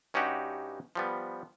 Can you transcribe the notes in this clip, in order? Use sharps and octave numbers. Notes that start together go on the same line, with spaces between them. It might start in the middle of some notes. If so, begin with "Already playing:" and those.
G2 C#4 D#4 F#4 G4 F#5
F3 G3 B3